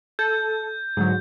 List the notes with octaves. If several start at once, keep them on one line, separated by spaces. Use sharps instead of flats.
A4 G6
G#2 D3 F#3